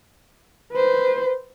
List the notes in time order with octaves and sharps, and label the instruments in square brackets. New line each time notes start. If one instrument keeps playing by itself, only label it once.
[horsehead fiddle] B4 C5